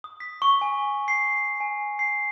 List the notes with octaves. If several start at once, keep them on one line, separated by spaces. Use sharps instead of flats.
D#6
B6
C#6
G#5
C7
G#5
C7